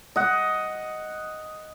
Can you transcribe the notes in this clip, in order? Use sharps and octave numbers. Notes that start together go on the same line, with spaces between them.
D#5 F#5